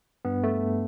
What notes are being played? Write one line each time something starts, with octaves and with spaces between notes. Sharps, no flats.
G2 B3
A3